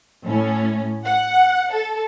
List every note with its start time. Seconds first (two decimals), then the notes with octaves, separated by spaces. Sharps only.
0.25 A2 C#4
1.05 F#5
1.72 A4